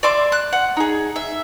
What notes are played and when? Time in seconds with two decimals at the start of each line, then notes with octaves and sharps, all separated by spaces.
0.03 D5 E5 C6 D6
0.32 F#6
0.53 F#5
0.77 D#4 G#4
1.16 E5